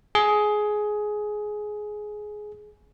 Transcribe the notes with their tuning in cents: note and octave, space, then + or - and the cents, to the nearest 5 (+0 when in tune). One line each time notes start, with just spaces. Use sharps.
G#4 +15